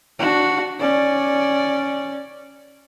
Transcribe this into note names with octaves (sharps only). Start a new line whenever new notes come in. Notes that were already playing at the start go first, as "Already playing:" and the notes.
D4 F#4
C#4 D5